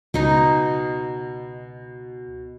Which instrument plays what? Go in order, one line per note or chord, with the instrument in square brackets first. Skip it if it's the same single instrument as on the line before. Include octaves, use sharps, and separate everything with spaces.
[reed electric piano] C#2 [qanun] B2 D#4